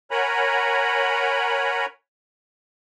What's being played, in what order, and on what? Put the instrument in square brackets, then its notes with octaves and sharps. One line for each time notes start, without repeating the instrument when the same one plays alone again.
[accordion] A#4 C#5 F#5 G#5 A#5 B5